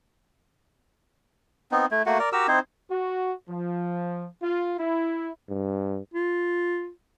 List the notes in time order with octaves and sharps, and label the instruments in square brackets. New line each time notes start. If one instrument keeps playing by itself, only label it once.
[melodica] B3 C4 D#4
A3 E4
A3 A#3 F#4 F#5
A#4 D5
F#4 G4 A#4 E6
C4 D#4 E4 C5
[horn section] F#4
F3
F4
E4
[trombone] G2
[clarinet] F4